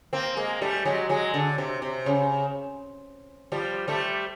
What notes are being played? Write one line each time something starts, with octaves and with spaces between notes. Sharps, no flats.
A#3 C4
G#3 A#3
G3 A3
F#3 G#3
F#3 G#3
D3
C3
C3
C#3
F3 G3
G3 A3